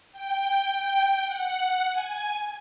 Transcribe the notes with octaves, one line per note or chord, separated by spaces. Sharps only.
G5
F#5
G#5